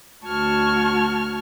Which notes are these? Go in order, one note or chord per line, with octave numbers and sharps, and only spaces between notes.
D2 F#4 A5 C#6 F6 G#6